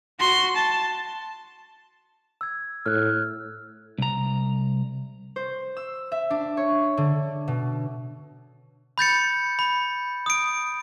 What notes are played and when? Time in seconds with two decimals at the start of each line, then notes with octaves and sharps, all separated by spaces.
0.20 F#4 C6
0.56 A5
2.41 E6 G#6
2.86 A2 F6 F#6
3.98 C2 A#5
5.36 C5
5.77 E6
6.12 E5
6.30 D4
6.57 C#5
6.97 D3
7.48 B2
8.98 B5 G6 A6 C#7
9.59 B5
10.26 D#6 D7